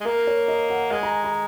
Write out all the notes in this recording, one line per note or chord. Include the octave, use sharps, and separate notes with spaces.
G#3
A#3 A#4
C#5
D#5
F#5
G#3 G#5
A#5
A#5